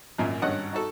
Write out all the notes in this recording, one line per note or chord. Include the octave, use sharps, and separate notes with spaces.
G#1 F#2 A#2 G#5
G#1 G2 C#4 D#5 F#5
D#4 F#4 A4